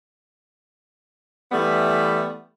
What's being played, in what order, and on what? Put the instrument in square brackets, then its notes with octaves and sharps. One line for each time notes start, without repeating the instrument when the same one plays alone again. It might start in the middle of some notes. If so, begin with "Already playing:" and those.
[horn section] E3 G3 A3 B3